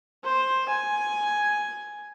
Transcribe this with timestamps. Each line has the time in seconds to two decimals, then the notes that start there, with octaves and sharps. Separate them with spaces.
0.24 C5
0.69 G#5